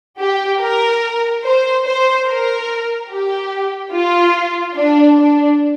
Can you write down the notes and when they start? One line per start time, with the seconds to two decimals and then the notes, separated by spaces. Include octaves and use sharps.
0.20 G4
0.61 A#4
1.44 C5
1.85 C5
2.27 A#4
3.10 G4
3.92 F4
4.75 D4
5.17 D4